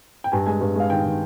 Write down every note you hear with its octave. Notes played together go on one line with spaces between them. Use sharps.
G5
G2 G#5
G#3 G#5
G2
G#3 F5
D#3 G5
D#3